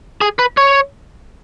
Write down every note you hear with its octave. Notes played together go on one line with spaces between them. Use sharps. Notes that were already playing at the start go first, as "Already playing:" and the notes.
G#4
B4
C#5